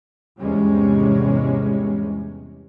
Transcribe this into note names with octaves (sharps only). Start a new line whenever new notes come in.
E2 G#2 C3 G3 G#3 C#4